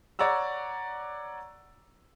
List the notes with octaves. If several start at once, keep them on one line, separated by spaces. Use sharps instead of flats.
C#5 D5 F#5 A#5 E6